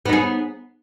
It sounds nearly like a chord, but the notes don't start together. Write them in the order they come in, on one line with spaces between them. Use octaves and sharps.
B3 D#4 G#4